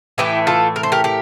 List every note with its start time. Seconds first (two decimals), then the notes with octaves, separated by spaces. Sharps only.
0.18 A2 E3 A3 E4 G4
0.47 F4 A4
0.76 A#4
0.83 C5
0.92 G4 A#4
1.04 G4 A#4